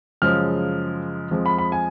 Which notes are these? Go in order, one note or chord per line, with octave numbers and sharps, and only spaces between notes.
F#2 C#3 F3 G#3 F6
F2 F3 G#3
B5
B5
G#5